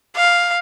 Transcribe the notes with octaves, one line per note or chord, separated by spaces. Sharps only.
F5